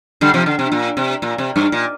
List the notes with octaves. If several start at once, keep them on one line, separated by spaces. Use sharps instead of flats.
D3 G3
C3 F3
D3
C3
A#2
C3
A#2
C3
G2
A#2